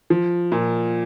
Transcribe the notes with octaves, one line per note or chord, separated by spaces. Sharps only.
F3
A#2